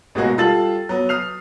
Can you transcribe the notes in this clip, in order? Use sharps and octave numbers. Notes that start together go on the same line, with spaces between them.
A1 B2 G#3 A#3 F#4 G#4
G3 F4 A4 E6 A6 F#7
F#3 B3
D#6 F6 C7 F7